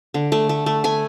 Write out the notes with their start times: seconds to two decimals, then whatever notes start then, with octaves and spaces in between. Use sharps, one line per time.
0.14 D3
0.32 A3
0.49 A3
0.66 A3
0.84 A3 G#5